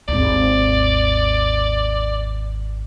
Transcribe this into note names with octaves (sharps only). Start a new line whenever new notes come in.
G#1 D#2 D5